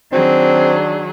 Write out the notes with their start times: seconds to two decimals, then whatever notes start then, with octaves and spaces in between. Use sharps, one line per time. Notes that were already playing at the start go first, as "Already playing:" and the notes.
0.12 D#3 F#3 C4 D4 G#4